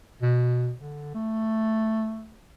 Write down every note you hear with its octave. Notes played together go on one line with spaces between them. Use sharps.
B2
D3
A3